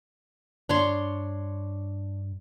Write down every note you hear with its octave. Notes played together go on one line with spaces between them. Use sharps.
G2 D4 C#5 C6